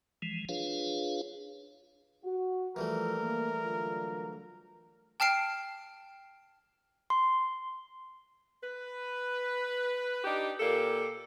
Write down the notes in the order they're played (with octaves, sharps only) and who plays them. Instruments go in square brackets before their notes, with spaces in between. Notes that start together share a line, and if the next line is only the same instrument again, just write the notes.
[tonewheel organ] E3 F3 G#3
D4 F4 G#4 B4 C#5 F5
[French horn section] F#4
[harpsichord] E3 G3 A3 [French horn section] F3 [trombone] A#4
[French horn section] A#3
D3 F#3 F4
[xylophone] G5 A5 F6 C7 D7
[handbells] C6
[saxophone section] B4
D4 D#4 G4
A#2 A#3 G4 A4